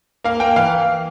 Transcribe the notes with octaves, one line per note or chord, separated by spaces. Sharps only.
A#3 F5
A#3 G5
E3 F5